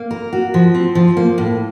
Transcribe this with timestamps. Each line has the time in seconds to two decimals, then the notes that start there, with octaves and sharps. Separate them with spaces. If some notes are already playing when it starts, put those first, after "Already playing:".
Already playing: A#3
0.11 A#4
0.33 F#4
0.54 F3
0.74 C4
0.95 F3
1.17 A#3
1.38 A2